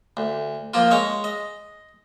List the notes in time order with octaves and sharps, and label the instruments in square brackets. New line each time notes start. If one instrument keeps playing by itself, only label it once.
[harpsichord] D2
F3 A#3 F4
G#3 C#5 D#5
D#5